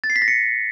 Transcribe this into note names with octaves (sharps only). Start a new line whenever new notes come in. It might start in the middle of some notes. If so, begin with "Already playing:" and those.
A6
C7
B6
A#6
C#7